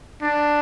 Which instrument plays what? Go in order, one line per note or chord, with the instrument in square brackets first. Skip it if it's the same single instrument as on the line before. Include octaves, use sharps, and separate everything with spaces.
[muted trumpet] D4